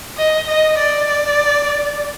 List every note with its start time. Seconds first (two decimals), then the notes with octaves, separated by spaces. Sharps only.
0.17 D#5
0.47 D#5
0.78 D5